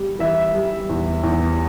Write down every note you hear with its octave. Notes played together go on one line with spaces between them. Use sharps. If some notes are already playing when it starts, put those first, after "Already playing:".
Already playing: G3
E3 E5
G3
E2
E2